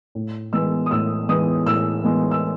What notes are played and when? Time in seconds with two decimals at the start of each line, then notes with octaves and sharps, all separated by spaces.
0.15 A2
0.53 E3 G#3 B3 E6
0.86 D#6
0.91 A2 E6
1.29 E3 G#3 B3 D#6
1.66 A2 E6
2.04 E3 G#3 B3
2.31 E6